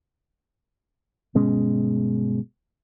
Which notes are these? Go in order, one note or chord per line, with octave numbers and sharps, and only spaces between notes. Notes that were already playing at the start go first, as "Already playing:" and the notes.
G1 B2 G#3 C#4